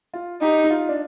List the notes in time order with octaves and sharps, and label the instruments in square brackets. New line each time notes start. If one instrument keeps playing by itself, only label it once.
[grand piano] F4
[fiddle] D#4 [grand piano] G4
[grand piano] D#4
F4
D4